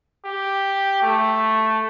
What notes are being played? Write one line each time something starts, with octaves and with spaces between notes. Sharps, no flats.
G4
A3